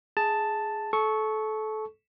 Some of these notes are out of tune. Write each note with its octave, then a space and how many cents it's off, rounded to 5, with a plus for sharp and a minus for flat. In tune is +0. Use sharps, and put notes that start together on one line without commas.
G#4 +5 A5 +0
A4 -25 C#6 +0